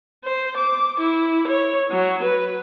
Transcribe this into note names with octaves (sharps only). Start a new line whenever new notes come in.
C5
D6
E4
C#5
F#3
B4